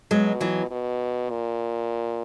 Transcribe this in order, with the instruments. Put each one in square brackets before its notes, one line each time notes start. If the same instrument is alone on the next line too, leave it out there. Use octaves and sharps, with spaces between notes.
[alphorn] B2 [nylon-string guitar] F#3 G#3
[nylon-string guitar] E3 F#3
[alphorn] B2
A#2